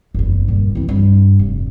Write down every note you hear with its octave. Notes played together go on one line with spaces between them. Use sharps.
F#1 E2
G2 A#2
E3 C4
G2
F1